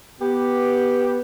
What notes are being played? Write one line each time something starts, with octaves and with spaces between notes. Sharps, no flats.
B3 G4